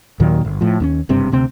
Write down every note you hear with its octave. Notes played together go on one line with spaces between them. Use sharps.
D#2 A#2 D#3 F#3
G1
A2 F3
D#2 B3 C#4
F#1 G2 C3 C4
D2 C3 C4